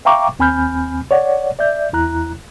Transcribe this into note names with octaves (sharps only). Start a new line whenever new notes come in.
E5 F5 G5 A#5 C#6 D6
D#2 C4 G#5 B5 F6 G6
C#5 D5 F#5
D5 E5 G6
E2 E4 A#5 F#6